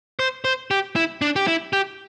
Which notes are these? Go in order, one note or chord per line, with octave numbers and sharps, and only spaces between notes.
C5
C5
G4
E4
D4
G4
E4
G4